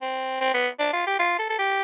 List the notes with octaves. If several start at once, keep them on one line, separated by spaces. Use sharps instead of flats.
C4
C4
B3
D4
F4
G4
F4
A4
A4
G4